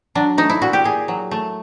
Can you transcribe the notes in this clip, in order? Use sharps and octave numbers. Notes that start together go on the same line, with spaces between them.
F#3 D4
A3 D#4
E4
A#2 F#4
G4
A#2 G#4
F#3
A3